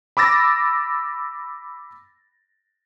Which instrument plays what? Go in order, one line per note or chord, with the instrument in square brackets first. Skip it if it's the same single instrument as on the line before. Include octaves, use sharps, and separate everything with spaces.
[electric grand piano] B5 D6 E6 A6 A#6